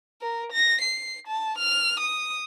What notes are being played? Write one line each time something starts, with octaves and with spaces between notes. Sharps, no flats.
A#4
A#6
C7
A5
F6
D#6